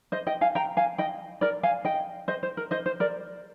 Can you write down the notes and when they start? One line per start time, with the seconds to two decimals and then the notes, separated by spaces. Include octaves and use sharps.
0.12 C5 D#5
0.27 D#5 G5
0.41 F5 G#5
0.55 G5 A#5
0.77 F5 G#5
0.98 D#5 G5
1.41 A#4 D5
1.63 F5 G#5
1.85 D#5 G5
2.28 C5 D#5
2.43 C5
2.57 A#4
2.71 C5 D#5
2.86 C5
3.00 A#4 D5